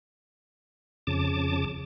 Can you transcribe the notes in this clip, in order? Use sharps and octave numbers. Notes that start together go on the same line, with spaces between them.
F2 C#3 A5 D6